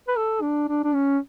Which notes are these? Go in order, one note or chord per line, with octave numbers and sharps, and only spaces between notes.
B4
A4
D4
D4
D4
C#4